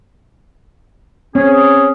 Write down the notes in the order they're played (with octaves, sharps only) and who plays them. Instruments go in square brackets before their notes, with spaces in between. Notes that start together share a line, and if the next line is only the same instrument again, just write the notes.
[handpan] C4 [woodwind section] C#4 G#4